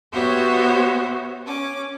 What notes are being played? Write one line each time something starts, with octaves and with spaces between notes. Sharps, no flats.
B3 F#4 G4 C5 C#5 E5
C#4 D6